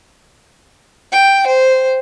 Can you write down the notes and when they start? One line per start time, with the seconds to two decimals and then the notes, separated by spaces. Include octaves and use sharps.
1.12 G5
1.46 C5